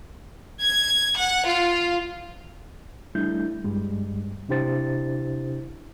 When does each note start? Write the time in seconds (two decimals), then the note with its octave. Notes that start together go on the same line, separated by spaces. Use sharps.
0.61 G#6
1.17 F#5
1.47 F4
3.15 G3 A3 D4 E4 G6
3.64 G2 G3 G#3
4.49 C3 D4 E4 G4 C5 A6